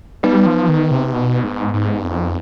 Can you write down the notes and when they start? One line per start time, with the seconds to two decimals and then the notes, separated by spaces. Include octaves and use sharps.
0.23 G3 B3 D#4 B4
0.46 F3
0.68 D#3
0.91 C3
1.13 B2
1.44 G#2
1.74 G#2
1.99 G2
2.04 F2